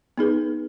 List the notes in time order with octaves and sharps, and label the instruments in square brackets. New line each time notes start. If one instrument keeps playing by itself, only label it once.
[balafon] B3 D#4 G#4 B4